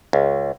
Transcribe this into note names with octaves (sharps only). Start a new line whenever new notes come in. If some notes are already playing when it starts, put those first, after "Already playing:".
C#2